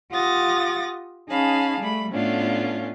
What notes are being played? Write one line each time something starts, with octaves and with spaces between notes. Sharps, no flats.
F4 G4 F#5 D#6 A6 A#6
C#4 D#4 G#4 F5 A5 B5
G3 A3 B5
A2 A3 B3 C#4 D4 F4